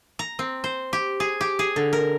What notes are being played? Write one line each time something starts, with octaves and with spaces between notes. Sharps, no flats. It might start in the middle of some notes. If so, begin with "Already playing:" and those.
A#5
C4
C5
G4
G#4
G4
G#4
D3
A#4